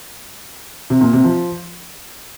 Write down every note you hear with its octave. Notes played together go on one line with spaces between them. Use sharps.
C3
A#2
C3
F3